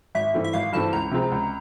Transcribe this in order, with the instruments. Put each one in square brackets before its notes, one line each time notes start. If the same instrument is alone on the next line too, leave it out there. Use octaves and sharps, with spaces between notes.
[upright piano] G#1 [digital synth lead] E5
[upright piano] G2 E3 A3 C4
[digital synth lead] E5
[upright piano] G#1 [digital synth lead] F5
[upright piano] G2 E3 A3 C4 [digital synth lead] A5
[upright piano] C#2 [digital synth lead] A#5
[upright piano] C3 F3 G#3 C4
C#2